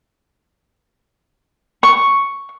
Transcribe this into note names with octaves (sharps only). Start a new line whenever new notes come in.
C#6